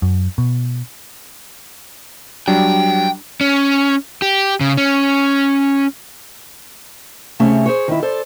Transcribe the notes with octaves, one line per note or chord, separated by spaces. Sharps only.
F#2
B2
F#3 G3 D4 G5
C#4
G4
C#3
C#4
C3 A3 C#4 G#4
G#4 C5 C#5
D#3 E4
A4 C5 D5